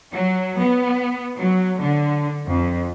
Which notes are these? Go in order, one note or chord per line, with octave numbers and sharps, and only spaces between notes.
F#3
B3
F#3
D3
F2